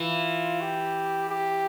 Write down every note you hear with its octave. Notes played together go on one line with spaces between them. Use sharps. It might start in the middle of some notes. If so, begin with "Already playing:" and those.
Already playing: E3 F4
G4
G4